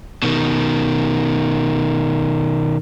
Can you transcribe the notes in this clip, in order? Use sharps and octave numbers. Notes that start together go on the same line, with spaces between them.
B2 D#3